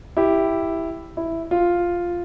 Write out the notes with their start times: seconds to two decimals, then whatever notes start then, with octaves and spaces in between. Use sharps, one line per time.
0.17 E4 G4
1.17 E4
1.51 F4